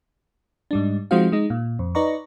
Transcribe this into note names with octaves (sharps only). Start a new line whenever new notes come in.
G#2 G3 D4
F3 G#3 C4 D#4 F#4 F5
G#3 D#4
A#2
F2
D#4 B4 D5 D#5 A#5 C#6